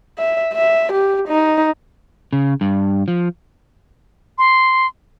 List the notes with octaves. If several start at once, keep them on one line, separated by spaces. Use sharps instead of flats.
E5
E5
G4
D#4
C#3
G2
F3
C6